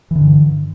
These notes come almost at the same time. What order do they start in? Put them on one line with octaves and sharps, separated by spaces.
E3 D3 G2